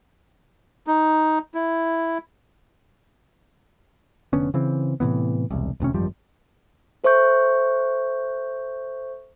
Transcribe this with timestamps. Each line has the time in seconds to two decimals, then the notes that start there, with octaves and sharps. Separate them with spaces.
0.87 D#4
1.55 E4
4.33 F1 D3 B3 C#4
4.54 C#3 E3 C4
5.00 A2 C3 E3 B3
5.51 E1 C2
5.80 E1 D2 C3 C#4
5.94 G#1 F#2 F3 G3
7.04 A4 C5 E5 C#6 G6